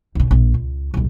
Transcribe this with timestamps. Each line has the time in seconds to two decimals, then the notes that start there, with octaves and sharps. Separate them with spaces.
0.15 B1 C#3
0.31 A#1
0.54 C#2
0.94 D#1 B1